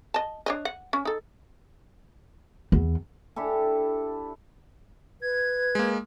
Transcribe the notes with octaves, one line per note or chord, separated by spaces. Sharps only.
D#5 A5
D4 C#5 D#5
F#5
C#4
D#4 A4
E2
D4 E4 G4 A4
B4 G#6
G#3 A#3